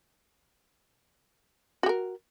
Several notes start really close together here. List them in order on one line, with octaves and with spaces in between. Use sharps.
F#4 G4 A#4